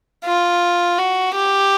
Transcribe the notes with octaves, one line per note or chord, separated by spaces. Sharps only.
F4
F#4
G4